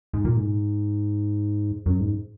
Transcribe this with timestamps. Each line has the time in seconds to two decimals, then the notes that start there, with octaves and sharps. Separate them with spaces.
0.13 G#2
0.25 A#2
0.36 G#2
1.86 F#2
2.00 G#2